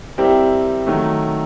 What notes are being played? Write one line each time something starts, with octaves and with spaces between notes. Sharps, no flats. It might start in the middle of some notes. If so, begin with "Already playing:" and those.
G3 C4 E4 G4 A#4
D#3 F#3 A3